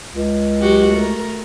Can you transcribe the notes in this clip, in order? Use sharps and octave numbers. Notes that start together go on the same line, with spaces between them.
C#2
F#3 F#4 G4
A3 A#4